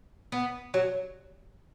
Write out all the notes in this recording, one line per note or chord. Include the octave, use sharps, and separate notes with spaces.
B3
F#3